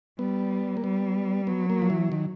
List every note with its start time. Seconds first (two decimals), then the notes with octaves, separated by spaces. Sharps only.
0.19 G3 B3
0.77 A#3
0.83 G3 B3
1.47 F#3 B3
1.70 A#3
1.82 F3
1.90 E3
2.12 D#3